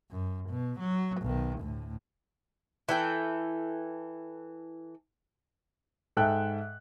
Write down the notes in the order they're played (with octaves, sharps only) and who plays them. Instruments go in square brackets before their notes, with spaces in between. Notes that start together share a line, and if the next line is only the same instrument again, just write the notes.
[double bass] F#2
B2
F#3
B1 D#3
D2 A2
[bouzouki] E3 A4 G5
[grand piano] G#2 A4 E5 G5 F#6